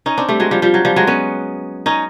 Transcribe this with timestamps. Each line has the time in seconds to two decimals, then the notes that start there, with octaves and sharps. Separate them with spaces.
0.06 C#4 D#4
0.17 C4 D4
0.29 G3 A3
0.40 F#3 G#3
0.51 F3 G3
0.62 F3 G3
0.74 F#3
0.85 F3 G3
0.96 F#3 G#3
1.07 B3 C#4
1.86 C#4 D#4